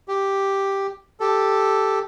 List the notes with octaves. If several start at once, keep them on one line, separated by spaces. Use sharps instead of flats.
G4
G4 A4